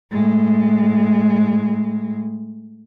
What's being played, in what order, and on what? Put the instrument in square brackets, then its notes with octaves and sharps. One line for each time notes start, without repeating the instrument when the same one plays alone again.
[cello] A2 G#3